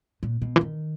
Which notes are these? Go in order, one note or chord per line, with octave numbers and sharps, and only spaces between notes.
A#2
B2
E3
D#3